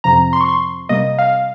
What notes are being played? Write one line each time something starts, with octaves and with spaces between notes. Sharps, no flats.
F2 C3 F3 A#5
C6
C#6
C6
C3 G3 A#3 D#5
F5